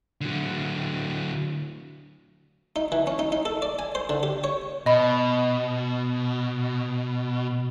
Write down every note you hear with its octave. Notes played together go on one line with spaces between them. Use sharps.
D3 F#3
D#4
E3
C#4
D#4
D#4
A4
D5
G#5
C5
D3
G4
C#5
B2 D#5 B5